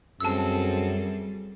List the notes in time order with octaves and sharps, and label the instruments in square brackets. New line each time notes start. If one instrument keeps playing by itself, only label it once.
[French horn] F#2 [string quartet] G3 [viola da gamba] C4 G#4 A4 [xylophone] A5 E6